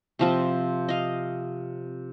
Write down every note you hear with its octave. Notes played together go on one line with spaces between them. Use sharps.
C3 F3 C4
D#5 F5